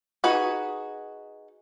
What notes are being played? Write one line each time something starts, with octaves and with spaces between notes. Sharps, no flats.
D#4 F#4 G#4 B4